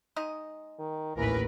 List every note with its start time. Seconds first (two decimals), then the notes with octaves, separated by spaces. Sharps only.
0.16 G#3 D#4 D#5
0.79 D#3
1.17 A1 D#2 E3 A#4 B4